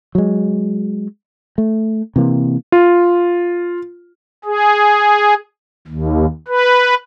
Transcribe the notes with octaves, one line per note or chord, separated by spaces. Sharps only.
F#3 G#3
A3
C3 E3 A#3
F4
G#4
D#2
B4